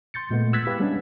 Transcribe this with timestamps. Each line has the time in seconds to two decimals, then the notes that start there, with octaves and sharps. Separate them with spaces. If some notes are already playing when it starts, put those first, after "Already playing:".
0.14 C6 G6 A6 C#7
0.30 A#2 G#3 A3 B3
0.53 E6 F#6 G#6 A6 B6
0.67 E4 G4 B4 F5
0.80 G3 G#3 B3 C#4 D4